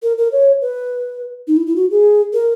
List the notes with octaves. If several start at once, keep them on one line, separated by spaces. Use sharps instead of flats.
A#4
A#4
C#5
B4
D#4
E4
E4
F#4
G#4
A#4